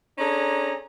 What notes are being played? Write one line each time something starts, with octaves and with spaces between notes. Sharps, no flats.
C#4 D4 G#4 A4 A#5